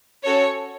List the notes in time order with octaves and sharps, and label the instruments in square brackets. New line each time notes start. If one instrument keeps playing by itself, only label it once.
[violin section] C#4 F#4 A4 C#5